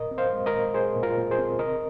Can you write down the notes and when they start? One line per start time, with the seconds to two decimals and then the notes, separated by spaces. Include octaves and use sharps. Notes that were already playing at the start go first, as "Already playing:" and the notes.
Already playing: A#2 A#4 D#5
0.11 C4
0.18 C5 F5
0.33 G#3
0.46 A#4 D#5
0.54 A#2
0.74 A#2 G#4 C5
0.96 A#2
1.03 F4 A#4
1.17 A#2
1.31 G#4 C5
1.38 C4
1.59 C3 A#4 D#5